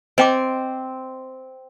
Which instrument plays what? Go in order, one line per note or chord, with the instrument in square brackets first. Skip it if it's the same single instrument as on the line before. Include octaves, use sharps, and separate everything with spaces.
[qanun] C4 [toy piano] D#5 G5 D6